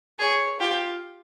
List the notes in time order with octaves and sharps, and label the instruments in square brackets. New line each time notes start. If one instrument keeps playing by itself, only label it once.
[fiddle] G#4 [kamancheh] C#5
[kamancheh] F4 [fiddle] G4